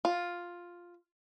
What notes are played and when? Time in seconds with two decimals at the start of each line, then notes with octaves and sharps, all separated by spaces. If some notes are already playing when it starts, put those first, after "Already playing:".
0.05 F4